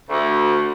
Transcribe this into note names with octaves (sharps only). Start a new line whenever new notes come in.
D2